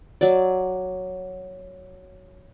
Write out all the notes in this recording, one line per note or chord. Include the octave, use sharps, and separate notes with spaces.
F#3 D5